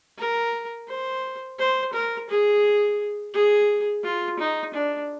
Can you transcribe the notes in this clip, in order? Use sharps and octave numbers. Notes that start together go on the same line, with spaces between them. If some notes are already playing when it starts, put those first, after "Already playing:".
A#4
C5
C5
A#4
G#4
G#4
F4
D#4
D4